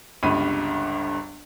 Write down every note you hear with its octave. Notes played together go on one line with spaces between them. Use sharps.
G1 C#2 G2 B5 D#7